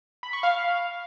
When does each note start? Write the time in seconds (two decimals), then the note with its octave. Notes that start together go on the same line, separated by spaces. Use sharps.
0.23 B5
0.33 C#6
0.43 F5